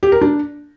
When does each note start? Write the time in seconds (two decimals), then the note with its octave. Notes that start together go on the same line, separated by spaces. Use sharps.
0.03 G4
0.12 A#4
0.21 D4